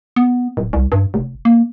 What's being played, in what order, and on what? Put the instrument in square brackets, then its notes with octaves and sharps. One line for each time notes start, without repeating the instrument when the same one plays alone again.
[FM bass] B3
D1
C2
G2
F1
A#3